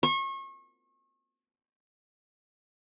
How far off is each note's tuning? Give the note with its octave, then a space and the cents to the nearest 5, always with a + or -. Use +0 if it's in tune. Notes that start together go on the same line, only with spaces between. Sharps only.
C#6 -35